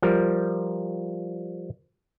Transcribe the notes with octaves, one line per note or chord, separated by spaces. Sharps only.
F3 G3 A#4